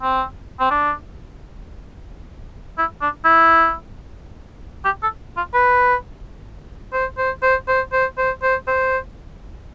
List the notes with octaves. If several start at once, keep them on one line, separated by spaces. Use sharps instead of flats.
C4
C4
D4
E4
D4
E4
G4
A4
F4
B4
C5
C5
C5
C5
C5
C5
C5
C5